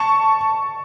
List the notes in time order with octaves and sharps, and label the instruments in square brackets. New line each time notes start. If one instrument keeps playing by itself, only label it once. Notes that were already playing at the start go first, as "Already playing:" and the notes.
Already playing: [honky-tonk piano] A5 C#6